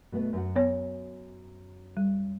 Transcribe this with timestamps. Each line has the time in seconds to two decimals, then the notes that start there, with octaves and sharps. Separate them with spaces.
0.12 B2 A3 B3
0.33 F#2 F#4 F#5
0.56 B3 C#5
1.97 G3